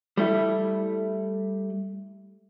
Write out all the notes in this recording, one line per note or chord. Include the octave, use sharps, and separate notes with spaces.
G3 A3 E4